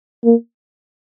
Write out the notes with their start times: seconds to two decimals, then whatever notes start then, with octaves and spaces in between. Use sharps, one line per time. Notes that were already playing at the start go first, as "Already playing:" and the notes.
0.24 A#3